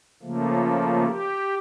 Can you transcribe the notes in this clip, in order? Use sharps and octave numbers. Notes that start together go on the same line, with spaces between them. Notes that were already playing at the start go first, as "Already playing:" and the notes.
C#3 F3 A3 A#3
G4